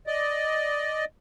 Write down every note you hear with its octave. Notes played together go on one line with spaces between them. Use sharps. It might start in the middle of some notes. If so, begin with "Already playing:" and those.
D5 D#5